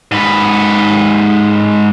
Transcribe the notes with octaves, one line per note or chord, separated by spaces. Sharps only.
G#2 B4